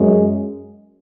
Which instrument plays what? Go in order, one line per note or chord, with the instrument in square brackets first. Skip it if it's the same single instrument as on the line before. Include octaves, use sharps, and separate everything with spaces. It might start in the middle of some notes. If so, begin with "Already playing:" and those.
Already playing: [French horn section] F#2 G#3